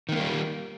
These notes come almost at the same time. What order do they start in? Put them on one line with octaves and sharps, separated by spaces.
D#3 B3 A#3 G3